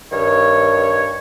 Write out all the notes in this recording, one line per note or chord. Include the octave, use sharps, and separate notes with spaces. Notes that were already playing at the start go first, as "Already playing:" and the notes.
G2 D#3 C#5